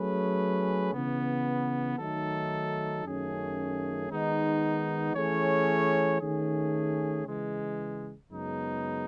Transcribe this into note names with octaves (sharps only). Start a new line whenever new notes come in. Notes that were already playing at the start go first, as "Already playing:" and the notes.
Already playing: F#3 A3 C#4 G#4 B4
C#3 E3 B3
D#3 F#3 A3 D#4 A4
F#2 D#3 A3 C#4 G#4
D#3 G#3 B3 D#4
E3 A3 C#4 G#4 C#5
D#3 A3 C#4 G#4
C#3 E3 G#3
F#2 C#3 G#3 B3 D#4